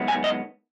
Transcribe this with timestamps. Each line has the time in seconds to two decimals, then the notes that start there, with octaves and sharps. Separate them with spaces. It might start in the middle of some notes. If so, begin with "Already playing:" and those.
Already playing: F#2 D#3 G#3 B3
0.08 G#5
0.24 D#5